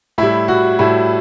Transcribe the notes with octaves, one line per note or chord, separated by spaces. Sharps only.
A2 G3 E4
F#4
A2 G3 E4